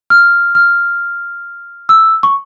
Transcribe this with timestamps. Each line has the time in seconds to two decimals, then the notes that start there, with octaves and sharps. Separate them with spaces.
0.10 F6
0.55 F6
1.89 E6
2.23 C#6